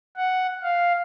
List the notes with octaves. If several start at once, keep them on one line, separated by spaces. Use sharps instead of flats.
F#5
F5